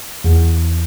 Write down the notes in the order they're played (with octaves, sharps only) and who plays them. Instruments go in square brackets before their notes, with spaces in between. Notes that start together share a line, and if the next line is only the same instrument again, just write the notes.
[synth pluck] E2